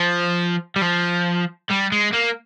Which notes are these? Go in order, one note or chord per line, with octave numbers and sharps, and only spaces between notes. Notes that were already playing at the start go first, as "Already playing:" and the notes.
Already playing: F3
G3
F3
G3
G#3
A#3